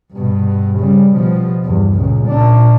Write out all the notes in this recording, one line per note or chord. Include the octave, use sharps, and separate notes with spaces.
G2 B2
C#3 G3
B2 F3
E2 G2
C#2 A#2
A#2 D4